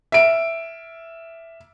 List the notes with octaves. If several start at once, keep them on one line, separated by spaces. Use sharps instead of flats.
E5 D7